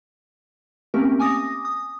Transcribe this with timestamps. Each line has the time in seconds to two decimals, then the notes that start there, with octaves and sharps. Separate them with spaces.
0.94 A3 A#3 C4 C#4 G4 A#4
1.19 G#5 D6 D#6 A#6
1.65 D#6